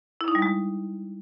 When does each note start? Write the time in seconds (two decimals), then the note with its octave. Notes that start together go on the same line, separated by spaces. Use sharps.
0.21 E4
0.28 D#4
0.35 G3
0.42 G#3